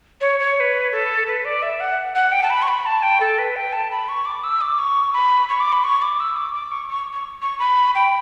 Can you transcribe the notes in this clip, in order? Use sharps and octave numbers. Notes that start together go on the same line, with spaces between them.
C#5
C#5
C#5
B4
A4
B4
D5
E5
F#5
F#5
G5
A5
B5
C#6
B5
A5
G5
A4
B4
G5
A5
B5
C#6
D6
E6
D6
C#6
B5
C#6
D6
B5
C#6
D6
E6
D6
D6
C#6
C#6
C#6
C#6
B5
G5